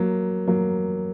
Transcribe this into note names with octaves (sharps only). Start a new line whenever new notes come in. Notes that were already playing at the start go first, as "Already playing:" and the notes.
Already playing: F#3 A#3
F#3 A#3